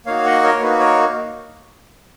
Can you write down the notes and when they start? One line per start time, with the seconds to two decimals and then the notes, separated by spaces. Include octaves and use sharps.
0.06 A#3 D#4 F#4 C#5 F5
0.25 D#5 F#5
0.43 A#4 C#5
0.61 A#3 D#4 F#4 B4
0.79 A#4 C#5